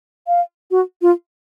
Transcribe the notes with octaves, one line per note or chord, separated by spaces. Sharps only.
F5
F#4
F4